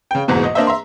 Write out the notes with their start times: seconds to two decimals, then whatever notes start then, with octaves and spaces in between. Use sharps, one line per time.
0.11 C#3 G5
0.28 F#1 E2 G#2 B2
0.44 D#5
0.55 A#3 D4 C5 D#5 E5
0.67 E5 A#5 C6